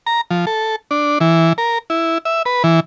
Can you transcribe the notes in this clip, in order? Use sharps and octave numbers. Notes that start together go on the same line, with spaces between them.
A#5
F3
A4
D4
E3
A#4
E4
E5
B4
E3